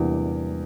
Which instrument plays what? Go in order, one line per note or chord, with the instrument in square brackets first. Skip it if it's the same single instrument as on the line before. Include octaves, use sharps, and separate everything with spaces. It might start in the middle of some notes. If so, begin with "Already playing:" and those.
Already playing: [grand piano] E2 C3 G3 A#3 D4